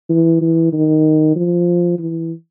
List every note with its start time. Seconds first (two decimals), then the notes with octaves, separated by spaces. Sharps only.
0.10 E3
0.41 E3
0.73 D#3
1.36 F3
1.99 E3